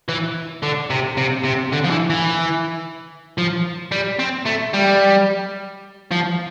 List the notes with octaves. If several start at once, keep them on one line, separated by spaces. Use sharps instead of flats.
E3
D3
C3
C3
C3
D3
F3
E3
E3
F3
G3
C4
A3
G3
F3